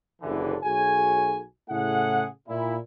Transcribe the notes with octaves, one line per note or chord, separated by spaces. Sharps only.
F#1 C2 D3 E3
B1 F#4 G#4 A4 C#5 G#5
A2 C#3 A3 E4 G#4 F#5
A#2 E4